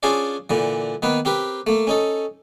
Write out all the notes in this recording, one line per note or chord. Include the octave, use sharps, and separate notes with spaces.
C#4 D4 F4 G#4 C5 D5
A#2 D3 E3
D#3 A#3 B3 B4
C4 G4 A#4 B4
A3 A#3
C#4 D#4 A4